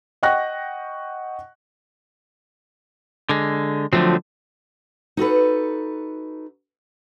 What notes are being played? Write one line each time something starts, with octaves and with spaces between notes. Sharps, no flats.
D#5 F#5 G5 C#6 F#6 A#6
D3 G#3
D3 F3 F#3 A3 C4
D#4 F#4 A4 B4